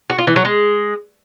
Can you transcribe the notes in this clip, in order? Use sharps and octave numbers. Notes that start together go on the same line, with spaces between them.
F#4
F4
E3
F#3
G#3